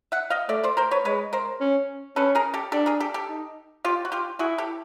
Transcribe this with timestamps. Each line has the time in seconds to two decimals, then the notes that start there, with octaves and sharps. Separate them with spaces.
0.12 E5 F#5
0.30 D#5 F5
0.49 A3 D5 E5
0.64 C5 D5
0.77 A#4 C5
0.91 B4 C#5
1.05 G#3 B4 C#5
1.33 A#4 C5
1.61 C#4
2.16 C#4 A4 B4
2.35 G#4 A#4
2.54 G4 A4
2.72 D4 G4 A4
2.86 G#4 A#4
3.00 G4 A4
3.14 G4 A4
3.28 D#4
3.85 F4 G4
4.05 F#4
4.12 F4 G4
4.39 E4 F#4 G#4
4.58 G4 A4